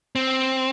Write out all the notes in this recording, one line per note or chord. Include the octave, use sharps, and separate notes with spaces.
C4